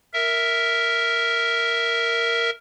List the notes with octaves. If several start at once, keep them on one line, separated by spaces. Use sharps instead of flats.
A#4 E5